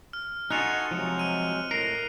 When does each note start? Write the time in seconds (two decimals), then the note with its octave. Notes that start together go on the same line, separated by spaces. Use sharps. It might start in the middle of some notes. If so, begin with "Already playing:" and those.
0.13 F6
0.50 D#4 F4 F#4 A4 G#5 F#6 C#7 F7
0.91 C3 F3 F#3 G#3
1.19 F6 D#7
1.71 A2 A#4 C7